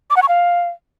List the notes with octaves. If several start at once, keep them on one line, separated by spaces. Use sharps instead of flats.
D6
F#5
C#6
F5